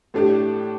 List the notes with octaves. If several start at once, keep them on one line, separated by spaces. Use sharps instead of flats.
A2 A3 D4 G4